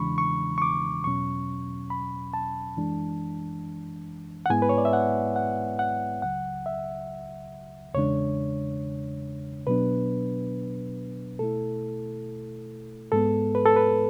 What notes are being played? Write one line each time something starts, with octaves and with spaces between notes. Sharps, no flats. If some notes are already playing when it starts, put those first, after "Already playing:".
Already playing: E2 C#3 E3 G#3 D4 B5 C#6
C#6
C#6
D6
E2 B2 F#3 C#4 C#6
B5
A5
F#2 E3 G#3 D4
F#5
G#2 G#3 B3 E4 G#5
B4
C#5
D5
E5
F#5
F#5
F#5
C#2 C#3 F#3 F#5
E5
E2 C#3 G#3 D4 C#5
B2 F#3 B3 D4 B4
B2 A3 E4 A4
G#2 G#3 B3 A4
B4
A4
B4